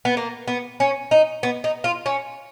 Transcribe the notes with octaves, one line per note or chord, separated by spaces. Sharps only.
B3
A#3
B3
C#4
D#4
B3
D#4
F4
C#4